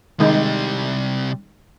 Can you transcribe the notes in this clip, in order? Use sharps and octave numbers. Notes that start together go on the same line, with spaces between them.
C3 D#3 G3 G#3 D#4